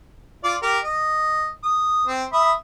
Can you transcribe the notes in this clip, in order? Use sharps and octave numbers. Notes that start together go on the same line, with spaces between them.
F4 D5 D6
G4 A#4
D#5
D#6
C4
E5 B5 D#6